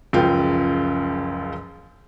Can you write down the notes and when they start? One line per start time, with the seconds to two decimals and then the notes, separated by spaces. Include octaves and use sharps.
0.13 F#1 C#2 F3 F4 F5 G5